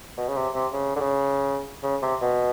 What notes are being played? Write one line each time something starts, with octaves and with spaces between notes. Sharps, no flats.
B2
C#3
C3
C3
C#3
D3
C#3
C#3
C3
B2